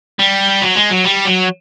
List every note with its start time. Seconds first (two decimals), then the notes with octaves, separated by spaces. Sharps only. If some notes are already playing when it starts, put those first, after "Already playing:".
0.19 G3
0.62 F#3
0.75 G#3
0.90 F#3
1.04 G3
1.25 F#3